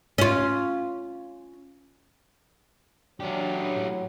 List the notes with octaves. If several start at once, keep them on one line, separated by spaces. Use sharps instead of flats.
C#4 F4
F#3 C#4 D4 G4
A2